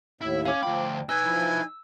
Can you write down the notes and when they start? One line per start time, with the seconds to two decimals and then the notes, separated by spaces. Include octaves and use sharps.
0.21 D#2 A2 E4 E5
0.45 C#4 F5 D6
0.63 D2 F3 G5 B5
1.09 D#4 B4 G#5 E6
1.25 F3 E4